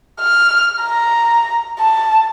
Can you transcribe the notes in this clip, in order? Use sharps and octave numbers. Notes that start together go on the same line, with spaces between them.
F6
A#5
A5